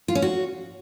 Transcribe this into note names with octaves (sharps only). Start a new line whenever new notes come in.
F4
C#4
F#4